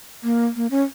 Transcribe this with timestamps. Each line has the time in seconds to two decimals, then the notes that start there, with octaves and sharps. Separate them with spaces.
0.23 A#3
0.56 A#3
0.71 C#4